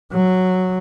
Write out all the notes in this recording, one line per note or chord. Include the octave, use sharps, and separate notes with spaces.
F#3